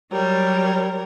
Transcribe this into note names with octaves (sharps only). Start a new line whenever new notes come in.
F#3 G3 A#4 C#5